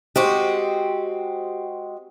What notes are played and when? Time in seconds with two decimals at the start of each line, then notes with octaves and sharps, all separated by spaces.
0.16 G#3 C4 F#4 G4